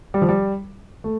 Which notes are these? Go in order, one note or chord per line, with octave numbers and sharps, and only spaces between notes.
G3
F3
G3
A3